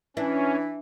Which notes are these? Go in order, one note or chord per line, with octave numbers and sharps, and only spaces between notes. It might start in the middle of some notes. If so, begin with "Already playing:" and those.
E3 C#4 D4